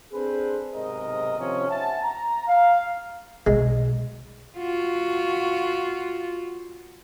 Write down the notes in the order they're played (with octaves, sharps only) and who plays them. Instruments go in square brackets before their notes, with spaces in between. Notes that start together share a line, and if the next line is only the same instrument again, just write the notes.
[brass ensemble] C4 D4 G#4 A4 B4 C5
B1 G#2 C3 A#4 D#5
C3 D#3 F3 C#4
E5 F#5 G#5 A5
A#5
F5
[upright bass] B1 [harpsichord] G#3
[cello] F4 F#4